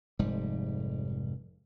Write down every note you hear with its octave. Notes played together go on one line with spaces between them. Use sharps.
F1 G#2 G3